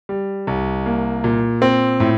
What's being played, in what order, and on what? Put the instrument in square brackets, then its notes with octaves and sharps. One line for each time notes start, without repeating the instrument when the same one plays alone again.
[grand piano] G3
C2
A#3
A#2
C4
A2